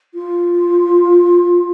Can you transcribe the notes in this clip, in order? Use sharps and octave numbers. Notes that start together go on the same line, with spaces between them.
F4